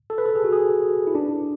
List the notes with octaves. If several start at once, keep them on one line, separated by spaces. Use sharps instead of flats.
A4
B4
A4
G#4
F#4
G#4
E4
D4